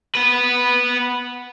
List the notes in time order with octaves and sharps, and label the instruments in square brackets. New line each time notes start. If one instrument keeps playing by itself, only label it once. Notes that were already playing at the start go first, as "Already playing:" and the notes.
[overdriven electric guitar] B3 B4